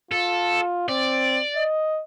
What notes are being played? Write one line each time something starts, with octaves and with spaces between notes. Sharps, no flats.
F4 A4
C4 D5
D#5